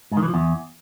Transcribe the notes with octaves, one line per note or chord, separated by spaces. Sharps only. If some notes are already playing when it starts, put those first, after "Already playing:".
G#2
D#3
E3
F3
E2